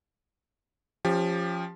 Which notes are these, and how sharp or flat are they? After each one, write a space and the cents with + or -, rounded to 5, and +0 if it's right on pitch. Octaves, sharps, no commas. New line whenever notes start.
F3 +0 C#4 +0 G4 +25